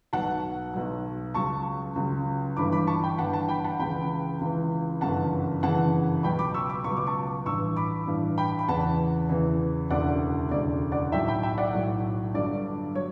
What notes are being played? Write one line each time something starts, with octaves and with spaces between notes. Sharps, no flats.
B1 B2 F#3 F#5 A5
B1 B2 F#3
C#2 C#3 F#3 A5 C#6
C#2 C#3 F#3
G1 G2 E3 B5 D6
B5 D6
A5 C#6
G5 B5
G1 G2 E3 F#5 A5
F#5 A5
G5 B5
F#5 A5
C#2 C#3 E3 G5 B5
C#2 C#3 E3
G1 F#2 C#3 E3 F#5 A5
G1 F#2 C#3 E3 F#5 A5
C#2 B2 F#3 G5 B5
B5 D6
C#6 E6
B5 D6
C#2 B2 F#3 C#6
D6
A5 C#6
A1 G2 E3 C#6 E6
B5 D6
A1 G2 E3
G5 B5
B5
E2 C#3 E3 F#5 A5
E2 C#3 E3
E1 D2 C#3 D5 F#5
E1 D2 C#3 D5
D5 F#5
B1 A2 F#3 E5 G5
G5 B5
E5 G5
D5 F#5
B1 A2 F#3
G1 G2 D3 F#3 D5
F#3 C#5